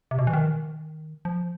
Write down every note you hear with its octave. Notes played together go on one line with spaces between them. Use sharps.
C3
B2
E3
D#3
F3